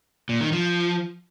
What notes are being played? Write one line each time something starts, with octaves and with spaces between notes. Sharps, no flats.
A#2
D#3
F3